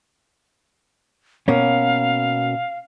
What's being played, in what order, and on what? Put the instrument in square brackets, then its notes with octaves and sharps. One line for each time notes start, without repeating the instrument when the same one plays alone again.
[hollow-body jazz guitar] B2 A#3 C#4 [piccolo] F5